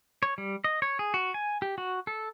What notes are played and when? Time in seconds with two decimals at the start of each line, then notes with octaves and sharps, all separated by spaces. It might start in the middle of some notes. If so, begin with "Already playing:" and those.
0.23 C#5
0.38 G3
0.64 D#5
0.82 C#5
0.99 G#4
1.14 F#4
1.34 G#5
1.62 G4
1.78 F#4
2.07 A4